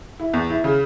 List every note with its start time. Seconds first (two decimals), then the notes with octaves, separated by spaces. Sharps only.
0.20 E4
0.34 E2
0.50 E4
0.64 C#3